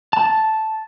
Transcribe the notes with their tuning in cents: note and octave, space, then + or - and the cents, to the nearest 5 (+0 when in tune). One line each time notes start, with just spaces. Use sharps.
A5 -5